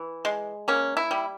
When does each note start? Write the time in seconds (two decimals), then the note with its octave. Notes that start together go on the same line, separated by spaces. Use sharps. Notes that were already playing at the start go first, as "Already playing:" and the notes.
Already playing: E3
0.25 G#3
0.68 A#3 C#4
0.97 E4
1.11 G3